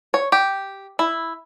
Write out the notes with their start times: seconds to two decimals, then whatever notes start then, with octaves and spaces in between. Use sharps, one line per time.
0.14 C#5
0.32 G4
0.99 E4